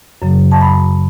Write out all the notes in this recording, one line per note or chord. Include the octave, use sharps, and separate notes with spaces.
F#2 C#3 F#3
A5
B5